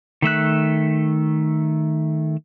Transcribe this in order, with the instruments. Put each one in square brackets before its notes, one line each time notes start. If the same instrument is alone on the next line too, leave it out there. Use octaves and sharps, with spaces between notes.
[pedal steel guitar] D#3 A3 E5 F#6